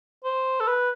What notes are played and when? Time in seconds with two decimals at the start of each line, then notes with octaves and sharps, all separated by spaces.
0.25 C5
0.60 A4
0.68 B4